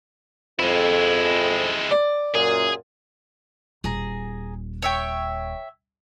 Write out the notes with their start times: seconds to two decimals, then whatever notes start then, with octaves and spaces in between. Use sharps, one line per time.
0.59 F2 G#3 E4
1.91 D5
2.34 F#2 A#2 G#4
3.84 D#1 G#4 A#5
4.82 C#5 E5 G5